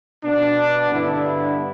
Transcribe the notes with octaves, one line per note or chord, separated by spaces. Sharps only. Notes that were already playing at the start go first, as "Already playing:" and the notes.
B2 B3 D4
G2 D3 B3 E4